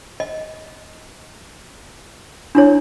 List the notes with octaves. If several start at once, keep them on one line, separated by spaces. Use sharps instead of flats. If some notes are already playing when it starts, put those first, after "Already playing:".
D#5
D4 E4 C#5